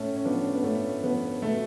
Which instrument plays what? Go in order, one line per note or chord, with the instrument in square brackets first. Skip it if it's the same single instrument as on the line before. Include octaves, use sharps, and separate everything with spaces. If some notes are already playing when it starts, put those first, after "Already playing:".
Already playing: [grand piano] A2 A3 C#4
C#4
F3 B3 D4
B3
A2 A3 C#4
F3 B3
B2 A3